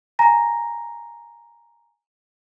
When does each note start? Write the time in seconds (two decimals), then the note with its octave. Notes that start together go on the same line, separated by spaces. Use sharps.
0.19 G#5 A#5 A#6